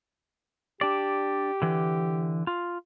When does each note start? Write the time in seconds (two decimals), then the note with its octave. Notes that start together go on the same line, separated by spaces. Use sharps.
0.81 D4 G4 D5
1.62 D3 E3
2.47 F4